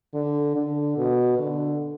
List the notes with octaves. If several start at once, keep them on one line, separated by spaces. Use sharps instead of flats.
D3
D3
B2
D3